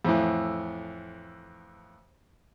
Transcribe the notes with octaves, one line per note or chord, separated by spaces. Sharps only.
F2 A2 E3